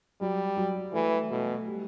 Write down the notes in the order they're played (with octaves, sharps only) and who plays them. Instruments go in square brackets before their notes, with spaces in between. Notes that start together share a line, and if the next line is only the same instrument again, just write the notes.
[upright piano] F#3 [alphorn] G3
[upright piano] F#3
[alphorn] E3 [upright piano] A3
[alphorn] B2 [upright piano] A3
[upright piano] G3